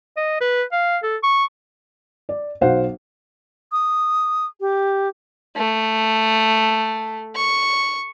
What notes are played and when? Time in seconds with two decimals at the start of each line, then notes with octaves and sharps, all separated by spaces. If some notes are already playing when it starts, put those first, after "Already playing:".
0.17 D#5
0.41 B4
0.72 F5
1.03 A4
1.23 C#6
2.29 D5
2.61 B1 F#3 C5 F5 F#5
3.72 D#6
4.60 G4
5.57 A3
7.36 C#6